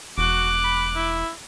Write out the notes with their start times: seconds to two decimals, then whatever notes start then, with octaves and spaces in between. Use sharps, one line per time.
0.18 E1 F#4 D6 F#6
0.64 B5
0.95 E4